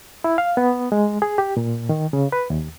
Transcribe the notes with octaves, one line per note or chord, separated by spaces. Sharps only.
E4
F5
B3
G#3
G#4
G4
A#2
D#3
C#3
B4
D#2